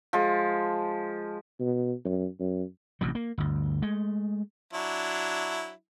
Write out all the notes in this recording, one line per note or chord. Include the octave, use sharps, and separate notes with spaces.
F3 G#3
B2
F#2
F#2
A1 C3 F#3
A#3
G1 D2
G#3 A3
F#3 D4 E4